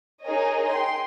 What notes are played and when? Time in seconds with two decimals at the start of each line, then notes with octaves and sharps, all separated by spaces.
0.24 D#4 G#4 A#4 C#5 D#5
0.70 G5 C6